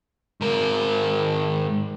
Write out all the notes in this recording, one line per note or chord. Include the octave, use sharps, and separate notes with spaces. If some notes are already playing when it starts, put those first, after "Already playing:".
G#2 A#4